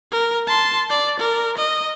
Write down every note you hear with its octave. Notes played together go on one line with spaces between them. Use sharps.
A#4
A5 C6
D5
A#4
D#5